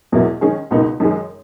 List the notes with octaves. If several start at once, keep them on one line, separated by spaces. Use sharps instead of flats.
E2 B2 F#3 A#3 E4
D#3 G#3 C#4 G#4
C#2 B2 A#3 D#4
F#2 D#3 G#3